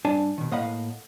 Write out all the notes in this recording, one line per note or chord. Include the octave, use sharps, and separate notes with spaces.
G2 D4 G#5 A5
B2 D#3
A2 A#3 D#5 F5 F#5 B5